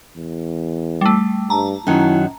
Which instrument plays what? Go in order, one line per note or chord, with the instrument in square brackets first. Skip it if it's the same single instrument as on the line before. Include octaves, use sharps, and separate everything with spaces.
[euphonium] E2
[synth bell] G3 A3
[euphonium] G2 [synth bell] A5 A#5
[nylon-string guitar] F#2 D#3 F#3 [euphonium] E4